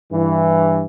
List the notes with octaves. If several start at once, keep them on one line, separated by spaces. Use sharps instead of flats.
G2 E3